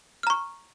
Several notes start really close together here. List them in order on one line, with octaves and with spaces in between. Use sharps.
F6 A#5 C#6